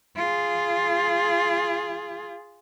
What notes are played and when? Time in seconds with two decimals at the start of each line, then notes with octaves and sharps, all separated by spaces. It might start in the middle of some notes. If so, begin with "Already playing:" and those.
0.16 F4 G#4